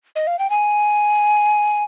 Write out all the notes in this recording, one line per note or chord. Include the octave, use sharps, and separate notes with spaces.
D#5
F5
G5
G#5